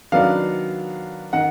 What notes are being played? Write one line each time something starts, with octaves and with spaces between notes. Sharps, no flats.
D#3 F#3 B3 D4 F5
D#3 F#5